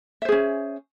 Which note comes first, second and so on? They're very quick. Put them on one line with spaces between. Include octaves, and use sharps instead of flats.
E5 C5 G#4 C#4